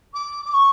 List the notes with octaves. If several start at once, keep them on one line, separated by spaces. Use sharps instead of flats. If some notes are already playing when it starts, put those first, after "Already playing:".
D6
D6
C#6